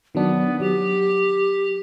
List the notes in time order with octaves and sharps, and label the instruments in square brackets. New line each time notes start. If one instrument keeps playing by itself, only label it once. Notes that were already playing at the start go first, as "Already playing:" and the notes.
[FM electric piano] D#3 F#3 D4 [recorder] B3
[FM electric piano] F#3 [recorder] G4